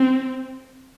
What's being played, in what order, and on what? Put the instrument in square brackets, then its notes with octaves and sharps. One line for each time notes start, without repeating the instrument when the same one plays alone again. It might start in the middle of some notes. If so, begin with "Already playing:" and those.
Already playing: [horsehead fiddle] C4